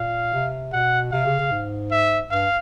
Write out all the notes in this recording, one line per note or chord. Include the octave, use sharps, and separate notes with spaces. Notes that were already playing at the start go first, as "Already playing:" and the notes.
Already playing: A#2 F5
C3
B2 F#5
C3 F5
C#3
C#3
G#2
E5
G2 F5